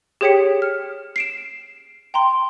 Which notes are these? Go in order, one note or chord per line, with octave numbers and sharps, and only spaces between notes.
G4 G#4 C#5 G5 B6 C#7
F6
C7 D7 E7
G5 A#5 C6